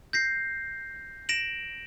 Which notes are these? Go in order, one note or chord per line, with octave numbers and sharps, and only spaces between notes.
G6 A#6 C7
A#6 D7 E7 F#7